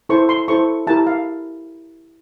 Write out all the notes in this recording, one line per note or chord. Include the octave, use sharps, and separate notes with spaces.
E4 A4 C5 C#6
C6
E4 A4 C5 C#6
E4 G4 A#4 A5
F5